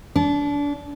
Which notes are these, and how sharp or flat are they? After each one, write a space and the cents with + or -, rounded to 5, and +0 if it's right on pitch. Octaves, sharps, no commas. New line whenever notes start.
D4 -30